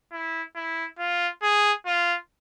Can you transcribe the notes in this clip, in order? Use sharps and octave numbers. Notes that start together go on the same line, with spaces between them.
E4
E4
F4
G#4
F4